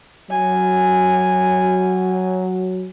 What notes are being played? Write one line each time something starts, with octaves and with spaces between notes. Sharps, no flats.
F#3 G#5